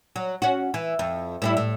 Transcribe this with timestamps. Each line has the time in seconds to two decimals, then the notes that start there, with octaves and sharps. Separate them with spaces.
0.16 F#3
0.42 C#4 F#4
0.74 E3
0.99 F2
1.42 A2 G3 E4
1.57 A2